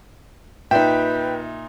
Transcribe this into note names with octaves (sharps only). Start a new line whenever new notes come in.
A#2 D#4 B4 E5 G5